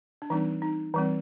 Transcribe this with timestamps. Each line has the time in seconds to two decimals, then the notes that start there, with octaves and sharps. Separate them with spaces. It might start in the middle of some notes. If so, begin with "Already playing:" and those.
0.22 D4
0.30 E3 G3 C4 D#4
0.62 D#4
0.94 E3 G3 C4